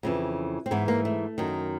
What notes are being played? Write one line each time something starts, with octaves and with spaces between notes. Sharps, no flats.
F2 C#3 E3
C4
G#2 E3 B3
A#3
A3
F#2 D#3